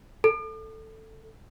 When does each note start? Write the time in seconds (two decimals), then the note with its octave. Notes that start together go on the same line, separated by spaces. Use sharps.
0.24 A4